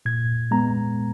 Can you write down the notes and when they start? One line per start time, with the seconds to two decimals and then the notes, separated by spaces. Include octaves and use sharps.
0.06 A#2 G#6
0.51 G#3 B3 A#5